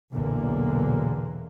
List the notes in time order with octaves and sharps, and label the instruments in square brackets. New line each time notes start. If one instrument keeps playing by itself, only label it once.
[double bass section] B1 E2 A#2 D3 A#3